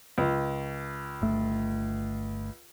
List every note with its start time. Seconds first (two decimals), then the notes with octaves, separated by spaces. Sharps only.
0.18 C#2
1.22 G1 A3